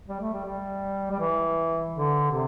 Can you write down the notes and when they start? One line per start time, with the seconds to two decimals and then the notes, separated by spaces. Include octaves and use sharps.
0.08 G3
0.21 A3
0.33 G3
0.45 G3
1.11 G3
1.20 E3
1.95 D3
2.31 C3